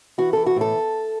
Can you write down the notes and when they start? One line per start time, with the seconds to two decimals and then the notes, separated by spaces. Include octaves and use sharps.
0.18 E3 F#4
0.33 E3 A4
0.46 F#4
0.56 A2 A4